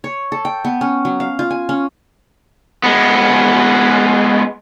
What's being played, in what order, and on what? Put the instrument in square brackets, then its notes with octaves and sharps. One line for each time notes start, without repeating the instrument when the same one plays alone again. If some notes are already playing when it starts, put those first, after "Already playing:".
[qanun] C#5
A4
G5
B3
C#4
F#3
F5
F4
G#5
C#4
[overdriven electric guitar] G#3 B3